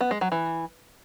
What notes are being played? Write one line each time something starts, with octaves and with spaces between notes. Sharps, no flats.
B3
G#3
F#3
E3